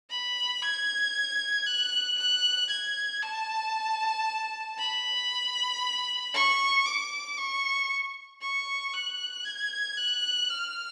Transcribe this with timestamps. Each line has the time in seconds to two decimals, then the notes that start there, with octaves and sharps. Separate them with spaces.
0.10 B5
0.62 G#6
1.66 F#6
2.18 F#6
2.70 G#6
3.23 A5
4.78 B5
6.34 C#6
6.86 D6
7.38 C#6
8.42 C#6
8.94 F#6
9.45 G#6
9.98 F#6
10.50 F6